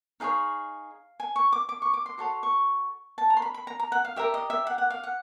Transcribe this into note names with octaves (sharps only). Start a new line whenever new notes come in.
D#4 G#4 C#5 F5
G#5
C#6
D6
D6
C#6
D6
C6
F#4 A4 C#5 C6
C#6
A5
A#5
C6
B5
B5
A#5
A#5
F#5
F5
G4 A#4 D5 E5
D#5
E5
F#5
F#5
F5
F#5